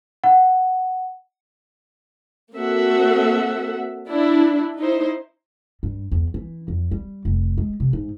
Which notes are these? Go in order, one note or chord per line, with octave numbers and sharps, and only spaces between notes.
F#5
A#3 C4 F#4 A4 E5 F#5
D4 E4
D#4 E4 C5
G2
E2
E3
F2
G3
F1
G#3
C3
G#2